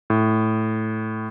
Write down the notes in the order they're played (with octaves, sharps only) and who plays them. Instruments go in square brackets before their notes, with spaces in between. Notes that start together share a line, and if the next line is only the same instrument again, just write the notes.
[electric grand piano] A2